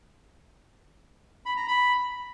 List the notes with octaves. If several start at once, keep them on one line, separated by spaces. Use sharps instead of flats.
B5
A#5
B5